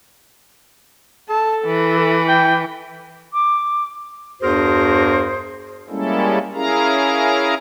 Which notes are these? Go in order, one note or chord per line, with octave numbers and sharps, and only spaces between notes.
A4 A5
E3
A4
G5
D6
E2 G2 F#4 G#4 A#4 C5
G3 G#3 A#3 C#4 E4 A4
C#4 E4 G#4 A#4 F5 A#5